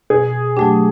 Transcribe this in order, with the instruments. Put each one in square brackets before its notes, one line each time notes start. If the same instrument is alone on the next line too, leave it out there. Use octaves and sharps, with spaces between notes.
[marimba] B2 [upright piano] G#4
[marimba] F#3 A3 D4 [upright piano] G4